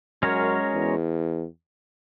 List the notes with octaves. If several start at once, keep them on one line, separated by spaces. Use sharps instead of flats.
F#2 G#3 C#4 F#4 A#4 C#5
E2